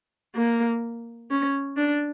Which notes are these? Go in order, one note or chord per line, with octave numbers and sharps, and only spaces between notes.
A#3
C#4
D4